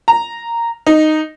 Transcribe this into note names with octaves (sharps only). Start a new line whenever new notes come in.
A#5
D#4